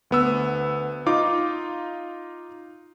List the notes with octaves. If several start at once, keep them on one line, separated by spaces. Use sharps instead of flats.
D2 B3 E6
D#4 F4 D6